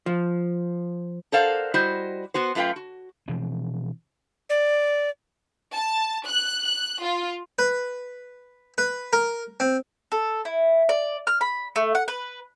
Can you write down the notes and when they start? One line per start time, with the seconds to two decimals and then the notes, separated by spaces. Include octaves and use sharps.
0.06 F3
1.32 A4 A#4 C5 D5 F5 F#5
1.74 G3 E4 F#4 C5 D#5
2.34 B3 F#4 C5
2.55 F#2 A3 F4 B4 F5 G5
2.76 F#4
3.28 B2 E3 F3 C4
4.49 D5
5.74 A5
6.29 F#6
6.65 F#6
7.04 F4
7.59 B4
8.78 B4
9.13 A#4
9.60 C4
10.12 A4
10.45 E4
10.89 D5
11.27 F6
11.41 B5
11.76 A3
11.95 F#5
12.08 B4